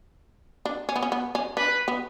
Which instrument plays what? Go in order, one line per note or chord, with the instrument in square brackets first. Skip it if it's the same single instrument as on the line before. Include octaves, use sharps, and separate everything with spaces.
[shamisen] D4
C#4
B3
C#4
B3
C#4
[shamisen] D4 [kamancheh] B4
[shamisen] B3